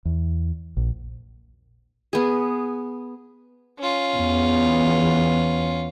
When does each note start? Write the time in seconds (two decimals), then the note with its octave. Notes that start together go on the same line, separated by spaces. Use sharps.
0.05 E2
0.77 A#1
2.13 B3 G#4
3.79 C#4 F4
4.16 E2 B3